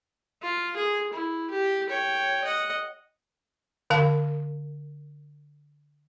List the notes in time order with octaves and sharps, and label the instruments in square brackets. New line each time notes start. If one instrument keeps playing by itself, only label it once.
[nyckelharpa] F4
G#4
E4
G4
C#5 G5
D#5 F#5
[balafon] D3 A#4 F5 A5